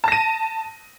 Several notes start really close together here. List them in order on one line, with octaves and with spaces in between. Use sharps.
A5 A#6 D#7